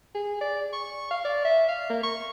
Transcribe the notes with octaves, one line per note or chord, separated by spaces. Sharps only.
G#4
D5
C#6
F5
D5
E5
F5
A#3
C#6